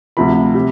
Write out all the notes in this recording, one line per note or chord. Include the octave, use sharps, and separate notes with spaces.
D2 C3 F3 B5
C3 G3